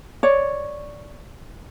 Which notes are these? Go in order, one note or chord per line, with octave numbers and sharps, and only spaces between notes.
C#5 D5